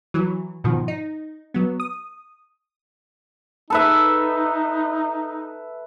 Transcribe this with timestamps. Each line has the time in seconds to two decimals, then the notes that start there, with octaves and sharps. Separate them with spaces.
0.14 E3 F#3
0.64 G#2 B2 D#3 F3
0.88 D#4
1.54 F#3 B3
1.80 D#6
3.70 D#4 A4 B4 E5